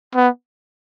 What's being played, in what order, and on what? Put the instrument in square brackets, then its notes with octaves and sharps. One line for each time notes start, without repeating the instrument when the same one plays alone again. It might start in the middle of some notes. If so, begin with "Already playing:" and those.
[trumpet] B3